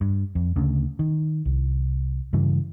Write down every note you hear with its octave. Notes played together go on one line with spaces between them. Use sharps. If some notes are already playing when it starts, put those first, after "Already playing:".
G2
F2
D2 C#3
D#3
C2
G2 C#3 E3